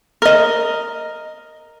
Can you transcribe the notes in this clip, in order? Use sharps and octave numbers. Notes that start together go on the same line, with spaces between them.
A#4 D#5